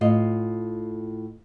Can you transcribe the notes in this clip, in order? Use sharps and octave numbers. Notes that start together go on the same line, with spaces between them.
A2 F4 D#5